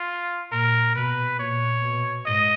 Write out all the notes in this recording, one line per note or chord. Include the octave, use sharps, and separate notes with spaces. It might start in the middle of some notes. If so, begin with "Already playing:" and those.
Already playing: F4
A#2 A#4
B2 B4
A#2 C#5
B2
G#2 D#5